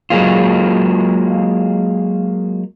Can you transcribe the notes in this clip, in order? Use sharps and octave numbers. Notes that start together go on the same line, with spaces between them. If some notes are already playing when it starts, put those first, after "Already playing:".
F#3 G#3 A#3 F4